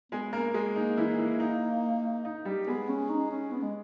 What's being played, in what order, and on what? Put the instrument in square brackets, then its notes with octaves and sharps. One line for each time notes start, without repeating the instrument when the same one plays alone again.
[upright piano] G#3 G#4 [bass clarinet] B3
[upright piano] A#3 A#4
G#3 G#4
[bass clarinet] A#3 [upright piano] D#4
[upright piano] E3 E4
E3 E4
D#4
D#4
G3 G4
[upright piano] G#3 G#4 [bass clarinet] B3
[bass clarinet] C#4
D#4
C#4
B3
G#3